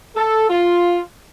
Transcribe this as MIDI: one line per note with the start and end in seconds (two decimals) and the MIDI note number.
0.16 0.48 69
0.49 1.00 65